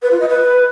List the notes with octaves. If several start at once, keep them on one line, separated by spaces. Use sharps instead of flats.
B4
F4
D#5
B4